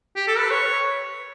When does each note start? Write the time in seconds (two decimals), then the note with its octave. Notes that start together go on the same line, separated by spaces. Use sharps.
0.16 G4
0.28 A4
0.38 B4
0.51 C#5